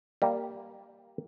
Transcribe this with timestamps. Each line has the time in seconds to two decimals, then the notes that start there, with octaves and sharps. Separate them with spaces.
0.22 G3 A#3